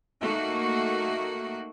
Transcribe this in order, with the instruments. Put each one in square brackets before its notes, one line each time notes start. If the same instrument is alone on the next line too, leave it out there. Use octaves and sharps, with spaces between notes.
[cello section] A3 A#3 D#4 F#4